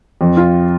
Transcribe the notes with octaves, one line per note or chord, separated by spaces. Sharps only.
F2
F4